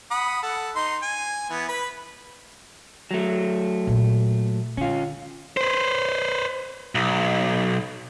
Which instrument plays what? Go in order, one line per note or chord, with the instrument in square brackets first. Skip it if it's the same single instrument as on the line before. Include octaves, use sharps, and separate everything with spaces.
[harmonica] F#5 B5 D#6
A4 F#5
D#4 C6
G#5
E3 B3
B4 B5
[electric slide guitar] F#3 A3
[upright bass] A#2 A#3
[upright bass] D3 [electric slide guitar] C#4 F4
[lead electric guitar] B4 C5
B1